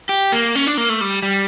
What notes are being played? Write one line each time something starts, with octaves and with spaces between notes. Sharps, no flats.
G4
A#3
C#4
D4
A#3
A3
G3
G3